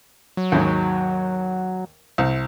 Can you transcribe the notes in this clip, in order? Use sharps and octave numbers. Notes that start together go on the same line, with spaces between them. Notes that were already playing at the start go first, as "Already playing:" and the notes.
F#3
D#2 G#2 D#3
C2 C4